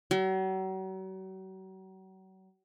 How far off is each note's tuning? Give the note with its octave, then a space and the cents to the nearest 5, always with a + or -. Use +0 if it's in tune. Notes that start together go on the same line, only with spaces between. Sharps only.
F#3 +40